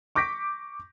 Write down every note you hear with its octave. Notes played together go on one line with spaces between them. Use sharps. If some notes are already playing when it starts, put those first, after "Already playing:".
C#6 D6 G6 A#6 B6 D7